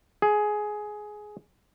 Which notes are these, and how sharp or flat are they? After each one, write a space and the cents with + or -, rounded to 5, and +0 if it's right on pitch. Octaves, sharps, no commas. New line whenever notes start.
G#4 +15